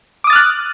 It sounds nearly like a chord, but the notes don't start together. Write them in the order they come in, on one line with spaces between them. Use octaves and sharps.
D6 D#6 A6 F6 F#6